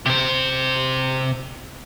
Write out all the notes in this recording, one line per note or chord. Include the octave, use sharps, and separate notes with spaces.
C3 C5